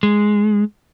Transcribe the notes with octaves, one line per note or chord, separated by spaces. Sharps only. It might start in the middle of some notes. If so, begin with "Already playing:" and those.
G#3